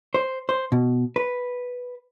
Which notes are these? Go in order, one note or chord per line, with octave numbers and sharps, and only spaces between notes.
C5
C5
B2
B4